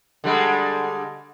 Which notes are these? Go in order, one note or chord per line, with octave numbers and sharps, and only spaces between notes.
D3 G3 G#3